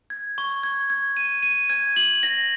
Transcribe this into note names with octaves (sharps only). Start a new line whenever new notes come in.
G#6
C#6
G#6
G#6
D#7
D#7
G#6
F#7
A#6